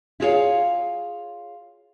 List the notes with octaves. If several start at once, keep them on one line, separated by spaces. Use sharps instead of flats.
E4 F4 G#4 A4 C#5 F5